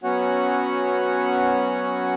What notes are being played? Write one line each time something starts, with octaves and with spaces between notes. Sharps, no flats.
F#3 B3 C#4 F#4 C#5 F#5